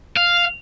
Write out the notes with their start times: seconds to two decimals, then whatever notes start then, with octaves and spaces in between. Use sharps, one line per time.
0.17 F5